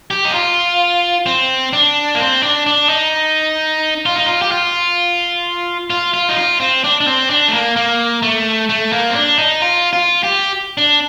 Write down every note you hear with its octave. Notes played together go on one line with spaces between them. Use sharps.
G4
D#4
F4
C4
D4
A#3
C4
D4
D4
D#4
F4
D#4
F4
G4
F4
F4
F4
D#4
F4
C4
D4
D4
C4
D4
A3
A#3
A#3
A3
A3
A#3
C4
D4
D#4
F4
F4
G4
D4